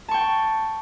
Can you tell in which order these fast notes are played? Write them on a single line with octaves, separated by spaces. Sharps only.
A5 C#6 G5